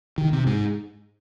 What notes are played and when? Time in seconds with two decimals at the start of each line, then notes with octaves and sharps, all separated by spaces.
0.18 D#3
0.32 C3
0.47 G#2